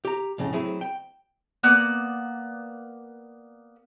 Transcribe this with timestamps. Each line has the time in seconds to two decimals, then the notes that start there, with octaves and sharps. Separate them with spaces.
0.05 G4 A#5
0.38 F2 A2 C#3
0.53 F#3 A3 C4 E4 G#4
0.81 G5
1.63 A#3 B3 D5